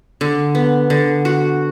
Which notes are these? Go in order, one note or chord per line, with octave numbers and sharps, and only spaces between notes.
D3
B3
D3
F#4